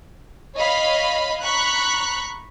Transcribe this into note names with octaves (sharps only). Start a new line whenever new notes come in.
C#5 D#5 F5 B5
A#5 B5 C#6 F#6